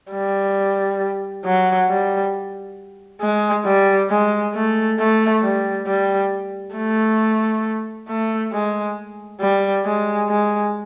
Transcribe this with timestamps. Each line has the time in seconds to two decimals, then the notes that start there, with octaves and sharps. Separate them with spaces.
0.11 G3
1.45 F#3
1.89 G3
3.21 G#3
3.65 G3
4.10 G#3
4.54 A3
4.99 A3
5.43 G3
5.87 G3
6.76 A3
8.08 A3
8.52 G#3
9.40 G3
9.85 G#3
10.29 G#3